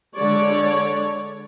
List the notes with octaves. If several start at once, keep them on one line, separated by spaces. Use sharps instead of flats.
D3 G#3 C#5 D5